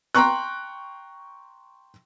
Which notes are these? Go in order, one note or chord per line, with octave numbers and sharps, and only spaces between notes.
G5 A#5 C6 C#6 F#6